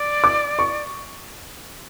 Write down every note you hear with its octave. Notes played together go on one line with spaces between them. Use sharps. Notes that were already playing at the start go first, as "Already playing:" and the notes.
Already playing: D5
D6
C#6